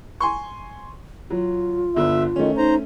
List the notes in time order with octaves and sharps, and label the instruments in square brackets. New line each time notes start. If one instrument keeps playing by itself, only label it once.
[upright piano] G#5 C6 C#6
[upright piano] F#3 [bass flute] F4
[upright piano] G1 D3 [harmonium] E5
[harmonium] D#3 [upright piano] A3 C#4
[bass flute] D#4 [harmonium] C5 A#5